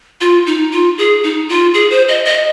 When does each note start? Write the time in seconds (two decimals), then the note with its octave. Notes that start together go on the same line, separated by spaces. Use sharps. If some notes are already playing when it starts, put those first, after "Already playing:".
0.21 F4
0.47 D#4
0.72 F4
0.98 G#4
1.23 D#4
1.49 F4
1.74 G#4
1.90 C5
2.08 D#5
2.25 D#5